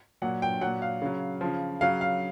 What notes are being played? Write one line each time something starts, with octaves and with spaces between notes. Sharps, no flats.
A#2 F#3 F#5
G5
A#2 F#3 F#5
F5
C#3 F#3
C#3 F3
C#3 F#3 F5
F5